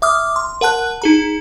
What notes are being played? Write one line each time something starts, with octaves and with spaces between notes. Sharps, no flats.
E5 D6 D#6 F6
C6
A#4 F#5 A5 F#6
D#4 G#4 A#5